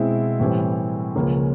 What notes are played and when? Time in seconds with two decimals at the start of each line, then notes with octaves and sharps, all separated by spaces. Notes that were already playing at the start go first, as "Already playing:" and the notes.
Already playing: B2 G#3 C4 E4
0.39 A2 E3 G3 C4
1.15 C#2 C#3 F3 A#3 C#4